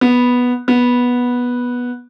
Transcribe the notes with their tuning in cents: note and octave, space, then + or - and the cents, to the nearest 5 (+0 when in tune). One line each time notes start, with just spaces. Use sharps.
B3 -5
B3 -10